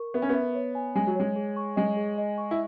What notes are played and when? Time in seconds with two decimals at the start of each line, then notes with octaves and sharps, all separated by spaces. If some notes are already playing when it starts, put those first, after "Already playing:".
Already playing: A#4 C#6
0.14 B3 E5
0.22 C#4
0.29 B3
0.35 E5
0.55 C#5
0.75 G#5
0.96 G#3 G#5
1.07 F#3
1.16 G#3 C#5
1.36 G#4
1.56 C#6
1.76 G#3 D#5
1.97 G#4
2.18 D#5
2.38 C#6
2.51 E4